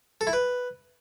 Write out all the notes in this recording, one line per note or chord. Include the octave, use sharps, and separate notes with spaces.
A4
E4
B4